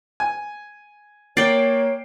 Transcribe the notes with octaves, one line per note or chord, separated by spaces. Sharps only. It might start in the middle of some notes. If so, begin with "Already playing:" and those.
G#5
A#3 C#5 D5 G5 C7 D7